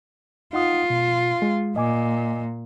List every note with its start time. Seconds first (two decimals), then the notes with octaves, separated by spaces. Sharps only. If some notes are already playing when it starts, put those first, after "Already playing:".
0.53 D#4 F4 F#5 D#6
0.90 B2
1.42 G#3
1.76 A#2 D#5 G#5 D6